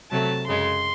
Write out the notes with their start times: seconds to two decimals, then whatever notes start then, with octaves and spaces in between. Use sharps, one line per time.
0.11 C3 F#3 A3 A5
0.48 F#2 C#3 G#3 C6